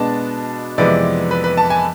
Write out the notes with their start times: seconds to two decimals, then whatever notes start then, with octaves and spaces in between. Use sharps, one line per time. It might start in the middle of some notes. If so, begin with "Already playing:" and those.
Already playing: B2 G#3 B3 D4 A5
0.78 F2 C3 E3 G#3 B3 D5
1.31 B4
1.44 B4
1.57 A5
1.70 G#5